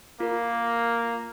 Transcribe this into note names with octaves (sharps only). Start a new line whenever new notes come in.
A#3 F4 A#4